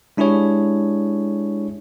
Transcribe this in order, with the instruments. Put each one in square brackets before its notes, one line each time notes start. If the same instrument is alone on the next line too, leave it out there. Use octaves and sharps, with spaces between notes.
[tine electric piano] G#3 D4 E4 G4 G#4 C#5